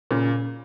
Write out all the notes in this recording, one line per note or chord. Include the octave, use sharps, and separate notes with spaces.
A#2 C#3